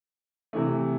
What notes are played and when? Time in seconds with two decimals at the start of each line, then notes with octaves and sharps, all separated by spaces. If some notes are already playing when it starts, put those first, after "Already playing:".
0.53 C3 E3 A3